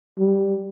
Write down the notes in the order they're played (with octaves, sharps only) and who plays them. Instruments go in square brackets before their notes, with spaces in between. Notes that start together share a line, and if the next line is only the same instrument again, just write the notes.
[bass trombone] G3